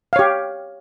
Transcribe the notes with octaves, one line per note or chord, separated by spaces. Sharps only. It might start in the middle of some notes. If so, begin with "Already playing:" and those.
G4 C#5 F5